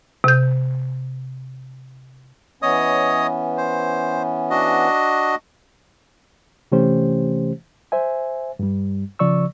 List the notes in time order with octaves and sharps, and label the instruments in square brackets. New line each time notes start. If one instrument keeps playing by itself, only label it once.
[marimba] C3 G6
[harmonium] E3 B3 C#4 [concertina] C#5 D#5 D#6
[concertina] C5
D4 F#4 D#5
[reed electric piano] C3 E3 A3 C#4 G4 C5
C5 E5 G#5
G2 G3
C#3 F3 D5 C#6 E6